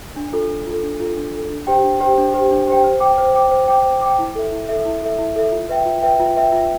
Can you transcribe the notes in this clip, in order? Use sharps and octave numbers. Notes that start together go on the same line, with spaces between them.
D4
F4 A4
D4
F4 A4
D4
F4 A4
D4
F4 A4
D4
G4 C5 G5
D4
G4 C5 G5
D4
G4 C5 G5
D4
G4 C5 G5
C5
G5 D6
C5
G5 D6
C5
G5 D6
C5
G5 D6
E4
A4 E5
E4
A4 E5
E4
A4 E5
E4
A4 E5
F4
B4 E5 G5
F4
B4 E5 G5
F4
B4 E5 G5
F4